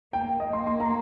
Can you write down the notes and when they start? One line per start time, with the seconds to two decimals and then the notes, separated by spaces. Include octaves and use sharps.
0.13 A#3 G5
0.40 D#5
0.53 A#3 C6
0.67 C6
0.80 A#5